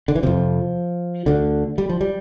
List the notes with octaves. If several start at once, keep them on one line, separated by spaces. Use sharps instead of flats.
D3
E3
F2 C3 F3
D2 D3
G3
F3
G3